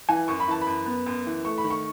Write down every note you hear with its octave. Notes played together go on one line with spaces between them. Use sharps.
E3 G#5
F#2 C#6
B5
E3 A5
B5
F#2
B3
F#2
E3
A3 C#6
B5
D#3
C#6